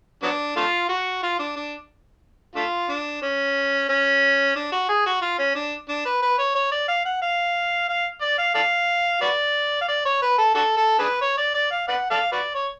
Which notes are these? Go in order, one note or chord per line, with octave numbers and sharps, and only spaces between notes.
F#3 B3 D4
A3 D4 F4
F#4
F4
D4
D4
A3 D4 F4
D4
C#4
C#4
D4
F#4
G#4
F#4
F4
C#4
D4
D4
B4
B4
C#5
C#5
D5
F5
F#5
F5
F5
D5
F5
A4 D5 F5
F#4 B4 D5
F5
D5
C#5
B4
A4
D4 F#4 A4
A4
D4 G#4 B4
C#5
D5
D5
F5
B4 D5 F#5
A4 D5 F5
F#4 B4 D5
C#5